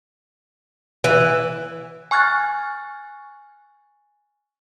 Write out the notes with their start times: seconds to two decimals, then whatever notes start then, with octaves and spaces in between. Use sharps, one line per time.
1.04 E3
2.11 G#5 C#6 F6 F#6 G#6 A6